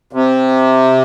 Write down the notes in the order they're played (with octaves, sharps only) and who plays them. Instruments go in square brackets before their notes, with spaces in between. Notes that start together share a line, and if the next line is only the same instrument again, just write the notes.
[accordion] C3